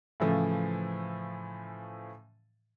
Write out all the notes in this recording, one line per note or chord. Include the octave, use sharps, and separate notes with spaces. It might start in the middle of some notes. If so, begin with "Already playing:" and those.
A2 C#3 E3 F3 A3